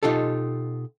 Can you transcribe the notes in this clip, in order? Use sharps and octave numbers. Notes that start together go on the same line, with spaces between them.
B2 D#4 F4 G4 A4